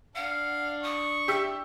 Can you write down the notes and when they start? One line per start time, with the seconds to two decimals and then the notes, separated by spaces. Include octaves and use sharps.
0.16 D4 F5 F#5
0.83 C#6 D#6
1.28 G4 E5 E6